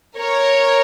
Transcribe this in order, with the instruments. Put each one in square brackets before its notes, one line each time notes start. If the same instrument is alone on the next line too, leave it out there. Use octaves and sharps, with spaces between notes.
[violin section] A#4 C#5